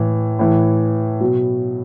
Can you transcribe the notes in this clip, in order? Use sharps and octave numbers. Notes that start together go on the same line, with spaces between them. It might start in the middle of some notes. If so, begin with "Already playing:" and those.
Already playing: A2 E3
A2 E3
B2 F#3